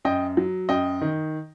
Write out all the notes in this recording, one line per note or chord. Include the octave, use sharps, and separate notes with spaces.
F#2 D#5 G5
F#3
F#2 D#5 G5
D#3